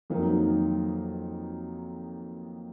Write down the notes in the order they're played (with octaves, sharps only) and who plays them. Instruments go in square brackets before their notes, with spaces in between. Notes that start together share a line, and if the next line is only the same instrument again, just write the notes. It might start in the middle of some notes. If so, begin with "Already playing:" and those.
[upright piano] F2 D#3 F#3 A#3 D#4